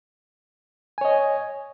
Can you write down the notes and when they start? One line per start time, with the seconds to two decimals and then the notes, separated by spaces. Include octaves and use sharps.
0.98 G#5
1.01 C#5
1.05 D#5